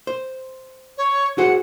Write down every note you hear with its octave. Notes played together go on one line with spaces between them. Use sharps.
C5
C#5
F#4 G#4 C5 F#5